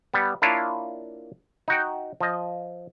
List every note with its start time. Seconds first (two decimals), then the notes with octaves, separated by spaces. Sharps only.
0.14 G3 B3
0.42 A#3 D4 E4 F4 C#5 A5
1.68 D#4 F#4 G5
2.21 F3 D#5